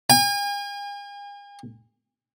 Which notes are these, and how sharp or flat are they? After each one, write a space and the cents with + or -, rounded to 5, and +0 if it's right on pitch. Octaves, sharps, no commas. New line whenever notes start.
G#5 -40